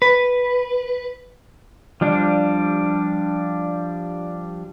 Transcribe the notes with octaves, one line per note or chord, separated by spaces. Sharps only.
B4
F3 G3 D4